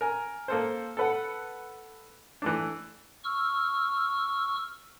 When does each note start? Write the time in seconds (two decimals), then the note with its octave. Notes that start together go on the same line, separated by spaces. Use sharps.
0.01 A#4 G#5
0.48 A#3 A4 C5
0.97 A4 B4 F#5
2.42 E3 A3 D4
3.24 C#6 E6 F6